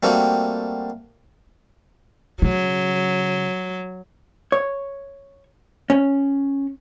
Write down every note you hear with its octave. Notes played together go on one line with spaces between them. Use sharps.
G3 A3 A#3 C4 F#4
C#3 F#3
C#5
C#4